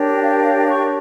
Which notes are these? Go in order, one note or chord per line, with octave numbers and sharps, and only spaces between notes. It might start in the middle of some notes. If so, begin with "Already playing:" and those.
Already playing: D4 G4 A#4 C#5
G5
F5
G5
F5
D6
C#6